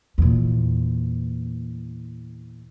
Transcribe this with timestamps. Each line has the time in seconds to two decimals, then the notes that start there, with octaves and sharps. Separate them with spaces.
0.18 E2 A#2